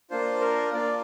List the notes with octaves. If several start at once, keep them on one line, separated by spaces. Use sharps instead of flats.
A#3 D4 F4 C5
A#4
A#3 D4 F4 D5